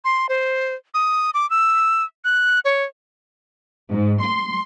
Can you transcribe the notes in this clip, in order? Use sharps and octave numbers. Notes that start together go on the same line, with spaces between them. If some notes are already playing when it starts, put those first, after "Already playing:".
C6
C5
D#6
D6
E6
F#6
C#5
G#2
C6